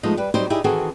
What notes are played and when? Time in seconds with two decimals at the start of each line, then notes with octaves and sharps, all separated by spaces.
0.03 F3 G#3 A3 B3 D#4 D#5
0.17 G3 B4
0.34 F#3 G3 C4 D#4 G4 C5
0.50 D#4 E4 G4 G#4
0.64 D#3 E3 C4 F#4 G#4 A4